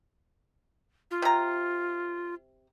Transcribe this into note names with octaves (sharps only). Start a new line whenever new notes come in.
F4
C3 A#5